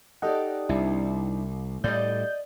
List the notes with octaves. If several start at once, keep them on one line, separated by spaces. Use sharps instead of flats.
D#4 G4 A4 D5 D#5 F#5
C2 G3 D4 E4
A2 G3 D5 D#5 G6